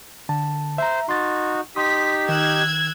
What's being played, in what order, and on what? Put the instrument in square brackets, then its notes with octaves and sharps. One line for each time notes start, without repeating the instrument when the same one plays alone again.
[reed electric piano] D3 A5
[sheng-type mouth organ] C5 [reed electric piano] E5 A#5
[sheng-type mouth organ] D#4 F#4 [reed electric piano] C6 A6
[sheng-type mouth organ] D#4 G4 [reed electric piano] C6 D#6 [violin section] B6
[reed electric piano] D#3 [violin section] E6 F#6 G#6